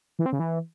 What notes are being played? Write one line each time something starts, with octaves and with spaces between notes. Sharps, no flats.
E3
C4
C#3
E3